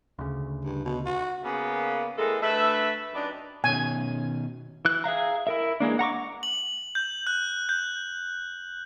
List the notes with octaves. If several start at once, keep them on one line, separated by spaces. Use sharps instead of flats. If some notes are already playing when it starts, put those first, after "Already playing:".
D2 C#3
G2
B2
F#4
C#3 A#3 B3
A2 E3 G#3 B3 A4 A#4
D2 A3 B4 E5
F#2 D4 D#4 G4 B4
B2 D#3 C#4 G#5
E3 F#6
G#4 E5 F5 A#5
E4 A#4 E5
E3 G#3 A#3 D4
F#5 A#5 C#6 D6
F#7
G6
F#6
G6